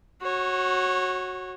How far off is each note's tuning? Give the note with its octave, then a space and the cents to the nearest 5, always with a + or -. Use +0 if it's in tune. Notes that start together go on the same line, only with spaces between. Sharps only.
F#4 +0 C#5 -25